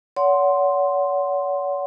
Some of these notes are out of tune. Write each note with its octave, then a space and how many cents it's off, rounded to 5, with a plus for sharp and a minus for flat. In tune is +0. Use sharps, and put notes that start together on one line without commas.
C#5 +40 F#5 +0 C6 +0